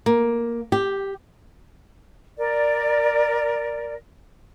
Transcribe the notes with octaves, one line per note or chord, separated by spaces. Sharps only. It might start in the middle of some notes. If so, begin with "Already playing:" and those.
A#3
G4
A#4 D5